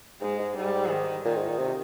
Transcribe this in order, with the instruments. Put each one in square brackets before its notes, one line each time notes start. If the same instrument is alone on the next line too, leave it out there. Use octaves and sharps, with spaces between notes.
[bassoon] G#2 [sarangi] G#3
[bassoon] G#2
[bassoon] G#2 [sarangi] G3
[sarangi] D#3
[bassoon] A#2 [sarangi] D#3
[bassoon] G#2
A#2
C3